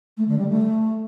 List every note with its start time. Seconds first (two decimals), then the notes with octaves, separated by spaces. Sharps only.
0.17 A3
0.28 D3
0.38 G3
0.49 A3